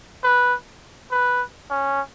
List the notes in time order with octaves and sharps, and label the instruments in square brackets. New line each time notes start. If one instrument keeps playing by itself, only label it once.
[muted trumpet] B4
B4
C#4